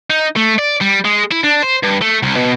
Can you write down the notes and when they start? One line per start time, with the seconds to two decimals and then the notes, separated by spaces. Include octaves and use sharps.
0.10 D#4
0.36 A3
0.58 D5
0.81 G3
1.05 G#3
1.32 E4
1.44 D4
1.63 C5
1.83 G2
2.02 A3
2.23 C2
2.36 B2